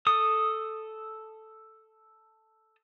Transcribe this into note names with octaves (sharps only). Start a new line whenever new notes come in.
A4 D#6